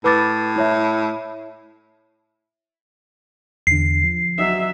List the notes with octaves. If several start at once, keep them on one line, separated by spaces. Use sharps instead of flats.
A2 B4 D6 A6
E4 C#5 E5
E2 D3 C7
F3
F#3 D#5 E5